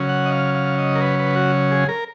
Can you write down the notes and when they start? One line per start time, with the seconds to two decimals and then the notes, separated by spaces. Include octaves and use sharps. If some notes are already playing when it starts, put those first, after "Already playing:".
Already playing: C#3 F#3 C#4
0.09 F#5
0.26 D#5
0.32 F5
0.55 F5
0.78 D#5
0.95 A#4
1.01 B4
1.19 B4
1.36 F#4
1.71 G#4
1.89 A#4